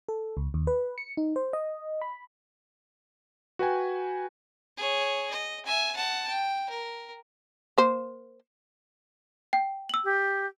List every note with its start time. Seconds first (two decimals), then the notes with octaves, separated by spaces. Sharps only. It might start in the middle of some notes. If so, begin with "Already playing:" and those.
0.09 A4
0.37 C#2
0.54 D#2
0.67 B4
0.98 C#7
1.17 D#4
1.36 C5
1.53 D#5
2.01 B5
3.59 F#4 B4 G5 G#5
4.78 G#4 C#5
5.30 D#5
5.65 E5 G#5
5.96 F#5 A5
6.28 G5
6.69 A#4
7.78 A#3 C5
9.53 G5
9.89 E6 F#7
10.04 G4